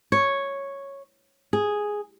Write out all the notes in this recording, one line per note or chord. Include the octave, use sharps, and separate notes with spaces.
C#5
G#4